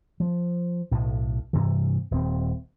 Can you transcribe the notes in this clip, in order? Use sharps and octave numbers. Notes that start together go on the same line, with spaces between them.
F3
B1 A2
G2 C3 E3
D#1 C4